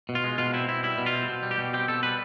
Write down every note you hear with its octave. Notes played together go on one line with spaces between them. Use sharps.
B2
F4
G#3
B2 F4
C4 E4
B2 E4
G3 E4
B2
F4
C4
B2
G3
G4
B2
C4 G4
B2 A4
G3 B4